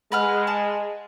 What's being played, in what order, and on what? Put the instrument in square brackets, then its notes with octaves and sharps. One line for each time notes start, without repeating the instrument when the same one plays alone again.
[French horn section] G#3 [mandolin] B4 F#5 F6
[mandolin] A5